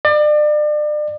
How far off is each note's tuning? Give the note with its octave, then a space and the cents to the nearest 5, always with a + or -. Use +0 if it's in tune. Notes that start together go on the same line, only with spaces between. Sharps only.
D5 +35